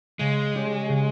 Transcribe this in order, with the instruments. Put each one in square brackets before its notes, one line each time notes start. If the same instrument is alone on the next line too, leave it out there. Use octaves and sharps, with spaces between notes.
[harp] C#3 [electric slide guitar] G#3
[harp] G3 C#4 G4 C#5
C#3